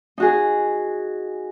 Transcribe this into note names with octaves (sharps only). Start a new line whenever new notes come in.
D#4 F#4 G#4